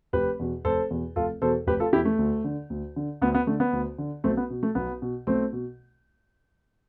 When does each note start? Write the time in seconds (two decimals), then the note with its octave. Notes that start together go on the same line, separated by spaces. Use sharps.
0.13 F1 G4 B4
0.39 E2 B2
0.65 F1 A4 C5
0.91 E2 B2
1.16 F1 F4 A4
1.42 E2 B2 A4 C5
1.67 F1 G4 B4
1.80 F4 A4
1.92 E2 B2 E4 G4
2.05 A3
2.19 D2
2.44 D3
2.70 D2
2.96 D3
3.22 D2 B3
3.34 B3
3.47 D3 A3
3.60 B3
3.73 D2
3.98 D3
4.24 B1 A3 C4
4.37 B3
4.50 B2
4.63 A3
4.75 B1 B3
5.02 B2
5.27 B1 A3 C4
5.53 B2